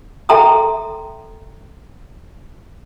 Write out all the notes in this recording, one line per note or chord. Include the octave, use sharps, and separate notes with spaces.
A4 E5 G5 A#5 C6 D#6